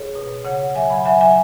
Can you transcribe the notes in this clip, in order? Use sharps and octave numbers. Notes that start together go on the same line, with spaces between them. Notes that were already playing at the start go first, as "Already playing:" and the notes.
Already playing: G#4 C#5
B2
C#3 C#5 F#5
F#3 E5 G#5
F#5 B5
F#3 E5 G#5
E5 G#5